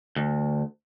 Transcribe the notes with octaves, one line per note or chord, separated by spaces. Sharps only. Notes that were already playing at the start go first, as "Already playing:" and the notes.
D2